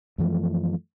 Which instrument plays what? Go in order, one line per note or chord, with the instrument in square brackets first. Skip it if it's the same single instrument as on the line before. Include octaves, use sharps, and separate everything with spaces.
[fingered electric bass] F#2 E3 F3 A3